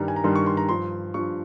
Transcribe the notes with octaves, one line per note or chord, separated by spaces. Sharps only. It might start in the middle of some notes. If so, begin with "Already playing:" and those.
Already playing: G2 D#3 G3 A#5
G#5
A#5
G2 D#3 G3 C6
C#6
C6
A#5
G2 F3 C6
G2 F3 C#6